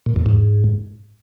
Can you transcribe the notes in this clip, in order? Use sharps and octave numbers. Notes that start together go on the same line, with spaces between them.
A#2
E2
G#2